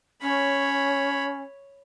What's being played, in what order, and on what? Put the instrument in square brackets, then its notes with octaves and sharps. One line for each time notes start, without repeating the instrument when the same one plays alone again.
[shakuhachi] C#4 [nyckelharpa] C#5 B5